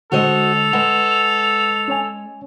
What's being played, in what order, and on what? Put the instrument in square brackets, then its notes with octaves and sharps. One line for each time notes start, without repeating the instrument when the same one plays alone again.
[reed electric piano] D3 G#3 [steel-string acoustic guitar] F#4 C5 D#5 [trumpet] A4 [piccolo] F7
[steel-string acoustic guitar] G#3 [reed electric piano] B4 F#5
[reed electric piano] C#4 C#5 G#5